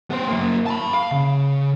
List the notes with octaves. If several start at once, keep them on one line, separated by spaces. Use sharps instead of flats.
B3 C5
F#2 A#3
A5 B5
F5
C#3